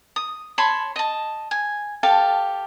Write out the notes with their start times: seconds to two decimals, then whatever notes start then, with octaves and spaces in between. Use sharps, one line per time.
0.16 D#6
0.58 C#5 A5 B5 C6
0.96 D#5 A5
1.51 G#5
2.03 G4 A4 F5 A5